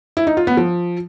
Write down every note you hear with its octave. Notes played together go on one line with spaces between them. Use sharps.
E4
D#4
F4
B3
F3